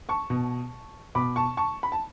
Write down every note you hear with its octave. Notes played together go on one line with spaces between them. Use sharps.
A5 C#6
B2
B2 B5 D6
A5 C#6
A5 C#6
B5
A5